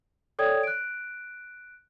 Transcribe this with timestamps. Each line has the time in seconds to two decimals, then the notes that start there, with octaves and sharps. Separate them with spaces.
0.39 A4 C#5 D5 G5 D#6 G#6
0.63 F#6 D7